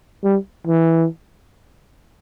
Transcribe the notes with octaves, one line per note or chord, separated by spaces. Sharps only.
G3
E3